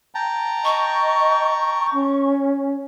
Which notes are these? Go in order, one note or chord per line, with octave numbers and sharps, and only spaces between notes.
G5 A5 A#5
D#5 C#6
C#4